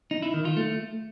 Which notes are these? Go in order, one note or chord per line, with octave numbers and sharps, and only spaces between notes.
D#4
E4
D#3
F4
A3